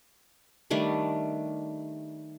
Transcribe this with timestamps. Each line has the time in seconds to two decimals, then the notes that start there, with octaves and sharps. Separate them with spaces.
0.70 D#3 G3 A3 D4